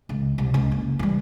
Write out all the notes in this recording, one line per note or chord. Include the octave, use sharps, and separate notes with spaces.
C#2
C2
C#2 C#3
F#1
E3 G3